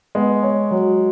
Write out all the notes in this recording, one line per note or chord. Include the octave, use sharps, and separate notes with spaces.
G#3 B3
C#5
F#3